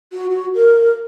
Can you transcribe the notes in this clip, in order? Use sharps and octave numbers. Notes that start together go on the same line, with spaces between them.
F#4
F#4
A#4